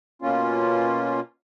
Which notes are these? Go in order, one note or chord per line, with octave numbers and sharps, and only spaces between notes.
B2 A#3 C#4 F4